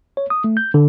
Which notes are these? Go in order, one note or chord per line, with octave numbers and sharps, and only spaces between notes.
C#5
D#6
A3
G6
D3